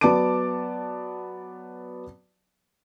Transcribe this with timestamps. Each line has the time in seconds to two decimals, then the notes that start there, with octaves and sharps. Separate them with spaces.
0.01 F#3 B3 D5 A5 D6 D7